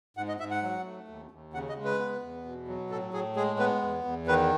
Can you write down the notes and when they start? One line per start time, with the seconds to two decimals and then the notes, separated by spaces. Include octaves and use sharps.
0.17 G#2 F#5
0.28 D#5
0.40 G#2 E5
0.51 F#5
0.62 F#3
0.85 A3
1.08 D#2
1.31 D#2
1.54 C#3 F#5
1.69 D#5
1.77 G#3
1.85 B4
1.99 B3
2.22 E2
2.45 B2
2.68 F#3
2.90 A2 A4
3.13 A2 G#4
3.36 G#3 G#4
3.59 B3 B4
3.82 E2
4.05 E2
4.27 D#3 B4